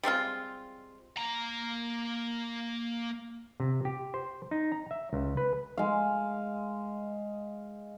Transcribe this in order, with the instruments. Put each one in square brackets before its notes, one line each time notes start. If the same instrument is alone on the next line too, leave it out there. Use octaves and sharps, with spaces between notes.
[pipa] G3 G#3 C4 F4
[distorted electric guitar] A#3 A#5
[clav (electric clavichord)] C3
G4
C5
D#4
A#5
E5
C#2
B4
[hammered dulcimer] G#3 F5